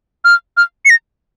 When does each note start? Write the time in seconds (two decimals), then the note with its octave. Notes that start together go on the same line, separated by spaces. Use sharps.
0.25 F6
0.57 F6
0.85 C#7
0.90 A#6